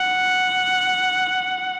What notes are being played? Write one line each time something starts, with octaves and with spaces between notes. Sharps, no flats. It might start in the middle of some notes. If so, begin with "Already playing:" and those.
Already playing: F#5